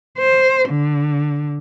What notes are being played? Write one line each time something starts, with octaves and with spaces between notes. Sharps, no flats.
C5
D3